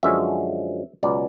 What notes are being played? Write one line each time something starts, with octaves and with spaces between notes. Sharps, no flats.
F#2 D3 F3 G#3 C#4 E5
C#2 B2 F#3 D5